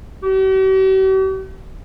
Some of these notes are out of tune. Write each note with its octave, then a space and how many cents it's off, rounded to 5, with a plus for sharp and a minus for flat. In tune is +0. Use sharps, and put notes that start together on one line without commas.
G4 -45